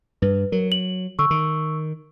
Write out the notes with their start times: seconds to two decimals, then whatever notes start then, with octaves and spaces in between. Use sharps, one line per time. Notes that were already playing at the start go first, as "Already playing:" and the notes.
0.22 G2 B4
0.52 F#3 A#4
0.72 F#7
1.19 D3 C#6 E6
1.31 D#3